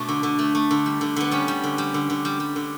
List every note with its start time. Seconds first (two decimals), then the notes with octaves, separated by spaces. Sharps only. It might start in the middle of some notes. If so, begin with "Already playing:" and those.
Already playing: B2 A3 D4
0.08 D3
0.23 D3
0.39 A3
0.55 A3
0.71 D3
0.86 G3
1.01 D3
1.16 D3 B3
1.31 G3 C#4
1.48 G3
1.63 D3
1.78 G3
1.94 D3
2.10 D3
2.25 G3
2.40 G3
2.56 D3